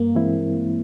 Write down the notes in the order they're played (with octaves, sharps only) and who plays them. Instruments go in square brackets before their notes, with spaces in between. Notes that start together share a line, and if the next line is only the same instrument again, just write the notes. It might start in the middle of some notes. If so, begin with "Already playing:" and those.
Already playing: [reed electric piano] G2 [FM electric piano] A#3
[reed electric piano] E3 G#3 C4 E4